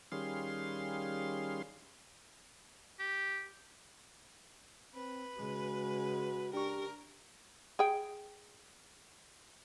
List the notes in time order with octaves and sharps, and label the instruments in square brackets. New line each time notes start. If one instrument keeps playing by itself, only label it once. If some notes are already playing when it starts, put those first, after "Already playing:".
[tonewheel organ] D#3 G3 C#4 G#4 F5 C6
[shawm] G4
[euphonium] C4 [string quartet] B4
[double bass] C#3 G#3 [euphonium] F#4
[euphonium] D4 [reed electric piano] G4 C#6 [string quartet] A#4
[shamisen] G#4 G5